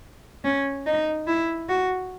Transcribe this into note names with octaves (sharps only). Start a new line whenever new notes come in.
C#4
D#4
E4
F#4